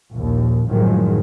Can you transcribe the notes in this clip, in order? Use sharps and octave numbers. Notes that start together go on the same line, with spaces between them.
A#1 D#2
F#2 A2 D#3 F3 F#3 G#3